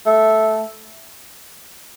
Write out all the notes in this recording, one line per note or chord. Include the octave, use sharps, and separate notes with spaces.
A3